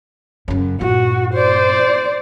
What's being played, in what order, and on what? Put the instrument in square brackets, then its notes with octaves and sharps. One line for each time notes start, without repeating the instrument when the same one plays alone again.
[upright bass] F#2 C#3
[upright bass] G2 A#2 [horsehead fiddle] F#4
[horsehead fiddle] C5 D5